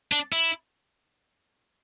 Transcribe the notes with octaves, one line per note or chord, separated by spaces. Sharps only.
D4
E4